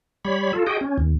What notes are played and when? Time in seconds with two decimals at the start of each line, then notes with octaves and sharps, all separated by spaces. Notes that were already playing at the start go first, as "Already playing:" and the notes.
0.25 G3 C#5 B5
0.53 F4 A4
0.67 F#4 G#4 D#5 G5
0.81 C#4
0.98 D#2